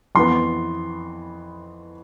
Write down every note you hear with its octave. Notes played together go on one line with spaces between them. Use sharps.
F2 E3 B3 C6